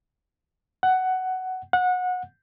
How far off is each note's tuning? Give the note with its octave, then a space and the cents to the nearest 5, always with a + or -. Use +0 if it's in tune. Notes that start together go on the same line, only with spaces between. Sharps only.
F#5 +10
F#5 -25